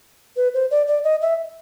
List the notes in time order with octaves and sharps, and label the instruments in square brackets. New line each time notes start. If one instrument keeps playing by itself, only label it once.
[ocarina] B4
C5
D5
D5
D#5
E5